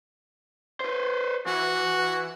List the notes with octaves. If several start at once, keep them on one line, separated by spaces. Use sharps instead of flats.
B4 C5
E3 F#4